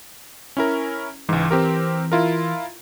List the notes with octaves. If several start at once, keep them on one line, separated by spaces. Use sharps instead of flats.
C#4 E4 A#4
C#2 G#2 E3
C4 G4 A#4
E4 F4 A#4